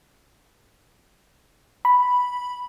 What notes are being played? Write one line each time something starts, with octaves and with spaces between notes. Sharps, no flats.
B5